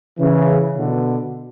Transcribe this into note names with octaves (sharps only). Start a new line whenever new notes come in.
C#3 E3
B2 D3